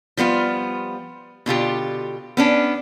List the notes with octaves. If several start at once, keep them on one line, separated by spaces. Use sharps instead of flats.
F3 G3 B3 F4
B2 D3 F4 G4
B3 C#4 D4